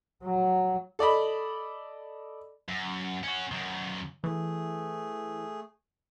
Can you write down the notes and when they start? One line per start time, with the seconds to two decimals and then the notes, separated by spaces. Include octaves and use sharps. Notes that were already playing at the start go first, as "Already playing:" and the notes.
0.24 F#3
0.99 A4 D5 D#5 B5
2.69 F#2
3.24 C#4 F#4
3.52 F#2 D#3
4.24 E3 A3 G#4